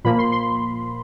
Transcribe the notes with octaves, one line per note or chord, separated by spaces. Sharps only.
A#2 F3 A#3 B5
C6
C6